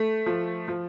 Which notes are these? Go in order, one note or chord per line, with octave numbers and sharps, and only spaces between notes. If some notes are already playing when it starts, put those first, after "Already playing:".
Already playing: A3
F3
F3